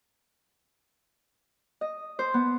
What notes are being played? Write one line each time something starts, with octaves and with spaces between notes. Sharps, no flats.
D#5
C5
B3